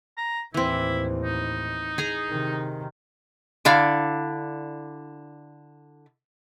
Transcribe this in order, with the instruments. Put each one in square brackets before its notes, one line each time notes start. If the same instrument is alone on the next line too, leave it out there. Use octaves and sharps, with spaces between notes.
[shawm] A#5
[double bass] D#2 A2 [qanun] E3 C4 [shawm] E4
[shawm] D#4
[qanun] G#4 G#5 A#5
[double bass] C3 D#3
[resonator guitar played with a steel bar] D3 E4 D5 F5